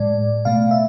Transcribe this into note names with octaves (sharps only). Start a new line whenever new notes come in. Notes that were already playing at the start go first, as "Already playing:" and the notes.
Already playing: A2 G#3 D5
B2 A3 F5
E5